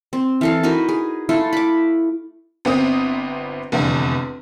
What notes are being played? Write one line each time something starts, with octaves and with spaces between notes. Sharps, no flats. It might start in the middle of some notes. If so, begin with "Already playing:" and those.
C4
E3 A4 F5
D#4 F#4 A#4 B4
G#4
A3 E4 F4 A4
B5 D6
G1 B3 C4 D#6
F1 E2 D3 B3